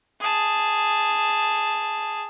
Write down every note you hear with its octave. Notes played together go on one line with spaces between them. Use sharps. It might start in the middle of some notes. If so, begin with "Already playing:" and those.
G#4 A5